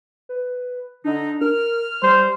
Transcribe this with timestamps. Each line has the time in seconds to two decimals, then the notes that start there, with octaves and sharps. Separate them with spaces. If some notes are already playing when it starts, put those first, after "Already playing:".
0.29 B4
1.04 D3 D4 D#4
1.41 A#4 F6
2.02 G3 C5